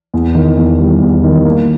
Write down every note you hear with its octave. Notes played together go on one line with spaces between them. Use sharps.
E2
D#3
E2
G3
E2
D#3
A#3